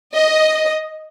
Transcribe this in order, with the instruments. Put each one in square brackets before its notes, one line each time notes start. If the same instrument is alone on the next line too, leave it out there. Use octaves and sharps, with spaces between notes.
[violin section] D#5